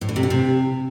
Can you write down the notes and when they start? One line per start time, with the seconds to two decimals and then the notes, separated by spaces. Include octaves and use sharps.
0.01 A2
0.09 D3
0.16 C3
0.23 D3
0.30 C3